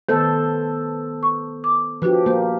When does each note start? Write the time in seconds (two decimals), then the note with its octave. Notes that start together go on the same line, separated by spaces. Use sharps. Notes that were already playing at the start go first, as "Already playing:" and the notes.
0.09 D#3 B3 A4 C5
1.23 C#6
1.64 D6
2.02 F3 D4 F#4 G4 B4
2.26 A#3 G4 C5